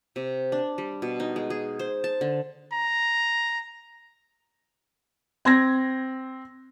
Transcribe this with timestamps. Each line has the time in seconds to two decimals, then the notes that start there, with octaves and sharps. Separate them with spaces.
0.16 C3
0.52 D4
0.78 G3
1.02 B2
1.20 D#4
1.36 G#3
1.50 G#4
1.79 C5
2.04 A5
2.21 D3
2.73 A#5
5.45 C4 G#6 A#6